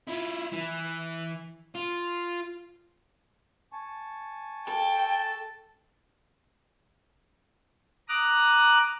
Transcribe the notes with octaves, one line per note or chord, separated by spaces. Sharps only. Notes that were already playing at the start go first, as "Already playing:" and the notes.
E4 F4
E3
F4
G#5 A5 C#6
A4 G5
A#5 D6 D#6 F#6